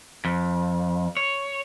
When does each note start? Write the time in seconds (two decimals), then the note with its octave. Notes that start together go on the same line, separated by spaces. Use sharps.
0.25 F2
1.17 C#5